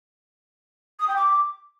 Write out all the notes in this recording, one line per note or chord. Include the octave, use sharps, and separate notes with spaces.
D#6
G5
D6